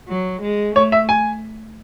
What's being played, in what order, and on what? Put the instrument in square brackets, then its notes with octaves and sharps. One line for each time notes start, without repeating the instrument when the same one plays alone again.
[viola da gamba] F#3
G#3
[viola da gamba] A3 [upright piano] C#5
[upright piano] E5
G#5